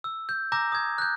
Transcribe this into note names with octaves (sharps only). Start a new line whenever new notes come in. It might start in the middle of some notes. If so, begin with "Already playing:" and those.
E6
G6
G#5 A#5 D6 E6 G6 A#6
D#6 G#6
F#6 G6